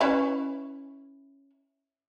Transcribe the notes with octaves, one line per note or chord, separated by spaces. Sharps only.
C#4 E4 B4